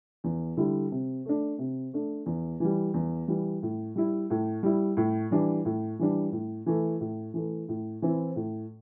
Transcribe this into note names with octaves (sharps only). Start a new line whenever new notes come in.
E2
D3 G3 E4
C3
A3 D4
C3
A3 D4
E2
E3 G3
E2
E3 G3
A2
G3 E4
A2
G3 E4
A2
E3 G3 D4
A2
E3 G3 D4
A2
E3 A3
A2
E3 A3
A2
E3 C4 E4
A2